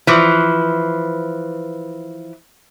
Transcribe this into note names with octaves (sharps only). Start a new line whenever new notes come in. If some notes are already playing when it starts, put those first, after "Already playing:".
E3 F3